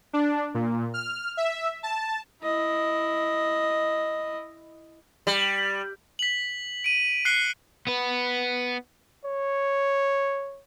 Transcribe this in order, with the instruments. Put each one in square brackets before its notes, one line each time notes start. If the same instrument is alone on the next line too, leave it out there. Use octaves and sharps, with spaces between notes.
[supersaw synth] D4
A#2
F6
E5
A5
[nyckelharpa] E4 D#5
[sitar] G3
[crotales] B6 F#7
D7 D#7
F#6 C7 C#7 G7
[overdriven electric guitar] B3 B4
[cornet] C#5